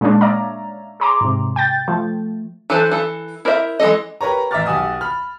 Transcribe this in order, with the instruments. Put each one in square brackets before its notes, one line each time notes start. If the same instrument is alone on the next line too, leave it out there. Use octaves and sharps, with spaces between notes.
[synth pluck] A#2 G#3 A#3 C#4 D4
C#5 D5 E5 F5 A#5
G#4 C#5 A#5 C6 D6
G#2 C3
G5 G6 A6
F3 A3
[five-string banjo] E3 D4 A4 B4 C5
E3 A4
E4 A#4 C5 D5 E5
E3 G#3 F#4 A4 D#5
[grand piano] G4 A#4 B4 C#5 A#5
A1 E5 A#5 D6 F6 A6
B1 G4 F#5 G#5 D#6 E6
B5 F6